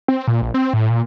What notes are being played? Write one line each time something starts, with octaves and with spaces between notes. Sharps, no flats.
C4
A#2
A#1
C4
A2
A#2